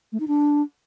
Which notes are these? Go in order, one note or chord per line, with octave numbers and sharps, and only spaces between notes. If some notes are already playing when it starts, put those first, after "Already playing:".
A3
D#4
D4